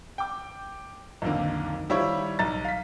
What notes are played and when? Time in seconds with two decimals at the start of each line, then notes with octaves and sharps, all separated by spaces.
0.18 G5 D6
1.22 B1 F2 D3 D#3 A#3
1.89 D#3 G3 E4 F4 C5 C#5
2.39 B1 A#5 A6
2.64 F5 B6